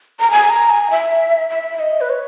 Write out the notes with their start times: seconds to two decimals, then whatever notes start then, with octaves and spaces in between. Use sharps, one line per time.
0.20 A#5
0.31 G#5
0.50 A#5
0.70 G#5
0.91 E5
1.50 E5
1.80 D#5
2.01 B4
2.10 C#5